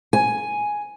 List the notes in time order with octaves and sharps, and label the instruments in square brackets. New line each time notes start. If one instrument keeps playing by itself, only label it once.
[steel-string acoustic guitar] G#5